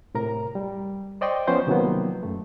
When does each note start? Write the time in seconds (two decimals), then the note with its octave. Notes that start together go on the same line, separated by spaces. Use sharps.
0.15 A2 C3 A#4 A#5
0.55 G3
1.21 C5 D5 D#5 G5 C6 C#6
1.47 F3 B3 C#4 C5
1.67 C3 D#3 F3 F#3 A#3 B3
2.23 F#2 A3